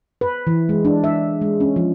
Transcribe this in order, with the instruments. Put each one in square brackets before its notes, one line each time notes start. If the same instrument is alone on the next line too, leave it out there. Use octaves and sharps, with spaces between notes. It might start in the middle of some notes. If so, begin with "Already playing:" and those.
[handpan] B4
E3
G#3
D4
E5
G#3
C#4
F3